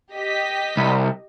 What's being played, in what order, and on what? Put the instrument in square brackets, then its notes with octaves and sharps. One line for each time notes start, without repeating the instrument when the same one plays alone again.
[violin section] G4 D#5 B6
[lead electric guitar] C2